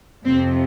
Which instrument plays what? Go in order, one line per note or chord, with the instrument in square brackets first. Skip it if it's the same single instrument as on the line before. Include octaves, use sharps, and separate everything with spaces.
[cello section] F2 C3 F3 C4